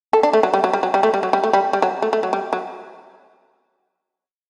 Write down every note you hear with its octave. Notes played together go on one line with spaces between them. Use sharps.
A4
D4
A3
F#3
G3
F#3
G3
F#3
G3
A3
G3
F#3
G3
A3
G3
G3
F#3
A3
A3
F#3
G3
F#3